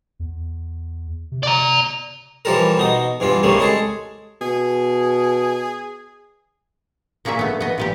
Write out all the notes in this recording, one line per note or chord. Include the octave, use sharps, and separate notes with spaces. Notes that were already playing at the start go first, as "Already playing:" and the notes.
E2
C3
D5 A#5
E3 F3 G3 A4 A#4
B2 D#4 D#6
E2 G2 E3 F4
C2 C#3 G3 A3 A#3
G#3 G#4 A4
B2 G#4
A#2 A#3 C#4 G#4 E5
A3 B3
B3 D#5
A#2 G3 G4